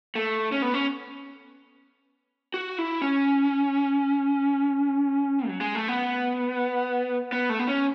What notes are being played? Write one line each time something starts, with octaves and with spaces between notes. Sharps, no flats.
A3
C#4
B3
C#4
F#4
E4
C#4
F#3
G#3
A3
B3
B3
A3
B3
C#4